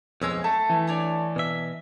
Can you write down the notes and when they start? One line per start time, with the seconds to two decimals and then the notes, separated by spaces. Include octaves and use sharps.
0.22 B1 F2 G#3 C#4 C#5 E6
0.44 A3 A4 A5
0.69 E3
0.87 D4 C#5 D5
1.36 B2 E5